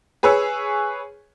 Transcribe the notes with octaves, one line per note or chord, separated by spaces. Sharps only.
G#4 B4 C#5 C#6 E6